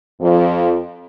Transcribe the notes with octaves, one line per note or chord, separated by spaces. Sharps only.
F2